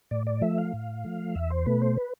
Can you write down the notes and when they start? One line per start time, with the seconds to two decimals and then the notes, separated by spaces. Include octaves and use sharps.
0.11 A2 D5
0.27 D5
0.41 F3 A3 E5
0.58 F5
0.73 A2
1.05 F3 A3
1.35 E2 E5
1.50 C5
1.66 B2 A3 B4
1.82 C5
1.97 B4